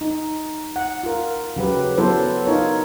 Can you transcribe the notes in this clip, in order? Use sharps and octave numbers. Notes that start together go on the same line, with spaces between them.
D#4
F#5
F4 A#4
C#3 F#3 G4 B4
F#3 B3 E4 A4 B4 C5
D#4 F4 A#4 C#5